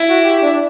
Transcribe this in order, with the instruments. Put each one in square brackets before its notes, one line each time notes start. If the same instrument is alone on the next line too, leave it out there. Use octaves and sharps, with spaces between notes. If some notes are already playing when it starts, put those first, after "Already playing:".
Already playing: [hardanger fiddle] E4
[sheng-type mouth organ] F#4
G4
G4
D4
D4